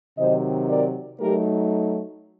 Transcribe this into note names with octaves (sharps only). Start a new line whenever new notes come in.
C3 D#3 F#3 C5 D#5
A#4 D5
F#3 A3 D#4 G4 A#4